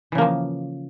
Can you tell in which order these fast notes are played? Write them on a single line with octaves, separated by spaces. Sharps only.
E3 C#3 A#3 F3